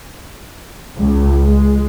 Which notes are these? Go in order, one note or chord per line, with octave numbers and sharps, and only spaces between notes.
C#2
G#3